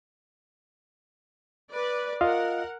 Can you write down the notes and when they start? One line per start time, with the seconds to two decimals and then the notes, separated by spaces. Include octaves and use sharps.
1.71 B4 D5
2.21 F4 A#4 D#5 F5 F#5